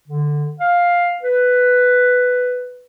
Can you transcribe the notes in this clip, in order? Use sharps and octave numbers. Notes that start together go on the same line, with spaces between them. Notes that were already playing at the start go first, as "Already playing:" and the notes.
D3
F5
B4